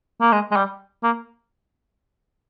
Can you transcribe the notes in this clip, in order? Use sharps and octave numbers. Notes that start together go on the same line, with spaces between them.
A#3
G#3
G#3
G3
A#3